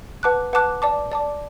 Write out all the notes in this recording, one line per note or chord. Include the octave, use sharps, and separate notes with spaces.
B4 F#5 A5 D6 F#6
B4 F#5 A5 D6 F#6
D5 A5 D6
D5 A5 D6